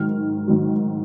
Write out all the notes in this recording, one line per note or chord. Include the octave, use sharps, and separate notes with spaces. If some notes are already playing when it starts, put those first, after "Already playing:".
Already playing: G#2 D#3 F#3 F6
G#2 D#3 F#3